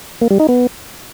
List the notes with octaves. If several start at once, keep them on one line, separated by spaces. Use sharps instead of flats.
A#3
G3
D#4
B3